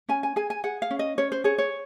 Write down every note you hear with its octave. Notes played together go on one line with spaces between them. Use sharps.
C#4 G#5
G#5
G#4 G#5
G#5
G#4 F#5
F5
C#4
D#5
C#4 C#5
C5
G#4 C#5
C#5